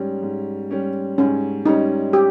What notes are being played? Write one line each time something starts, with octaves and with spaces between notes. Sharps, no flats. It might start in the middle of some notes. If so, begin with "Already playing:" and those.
Already playing: G#2 G3 C#4
G#2
G3 C#4
G#2 C#4
G3 C#4 D#4
G4